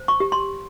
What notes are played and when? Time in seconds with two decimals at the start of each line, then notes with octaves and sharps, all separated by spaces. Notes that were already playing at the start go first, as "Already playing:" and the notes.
Already playing: C5
0.08 C#6
0.20 G4
0.32 C6